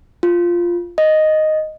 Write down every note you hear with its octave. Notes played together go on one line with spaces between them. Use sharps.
F4
D#5